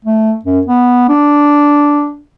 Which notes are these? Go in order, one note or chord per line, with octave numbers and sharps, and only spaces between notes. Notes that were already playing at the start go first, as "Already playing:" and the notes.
A3
F#2
B3
D4